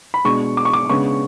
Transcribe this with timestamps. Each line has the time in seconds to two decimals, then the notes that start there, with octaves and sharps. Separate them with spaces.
0.14 B5
0.25 B2 G#3 D4 C#6
0.57 D6
0.65 C#6
0.73 D6
0.90 C#3 G#3 B3 D4 C#6